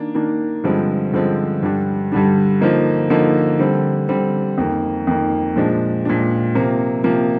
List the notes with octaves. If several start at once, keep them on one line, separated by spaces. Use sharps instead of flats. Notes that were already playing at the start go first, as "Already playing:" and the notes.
Already playing: D#3 A#3 D4
D#3 A#3 D4
G2 D3 F3 G#3 C4
G2 D3 F3 G#3 C4
G2 D3 G3 D4
G2 D3 G3 D4
D3 F3 A#3 D#4
D3 F3 A#3 D#4
D3 G3 C4
D3 G3 C4
F2 D#3 A#3
F2 D#3 A#3
A#2 F3 G#3 D4
A#2 F3 G#3 D4
C3 F3 A#3
C3 F3 A#3